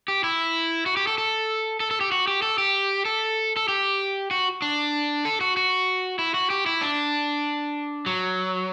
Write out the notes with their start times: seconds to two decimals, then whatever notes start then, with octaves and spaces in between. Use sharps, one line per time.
0.08 G4
0.24 E4
0.86 F#4
0.97 G4
1.07 A4
1.18 A4
1.80 A4
1.91 A4
2.01 G4
2.12 F#4
2.27 G4
2.42 A4
2.58 G4
3.05 A4
3.56 A4
3.68 G4
4.31 F#4
4.62 D4
5.25 A4
5.41 F#4
5.57 F#4
6.19 E4
6.34 F#4
6.50 G4
6.66 E4
6.81 D4
8.06 F#3